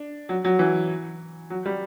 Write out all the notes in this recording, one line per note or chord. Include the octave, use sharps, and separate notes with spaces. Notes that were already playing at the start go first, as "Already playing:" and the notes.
Already playing: D4
F#3
F#3
E3
F#3
G3